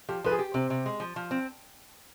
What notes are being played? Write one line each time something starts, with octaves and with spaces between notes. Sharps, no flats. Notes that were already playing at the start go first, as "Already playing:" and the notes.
F3 G4
F3 B4
G#4
G4
C3 C4
C3
G#3
F3
F3
C4